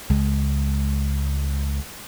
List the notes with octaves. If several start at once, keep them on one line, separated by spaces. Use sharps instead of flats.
C#2 G#3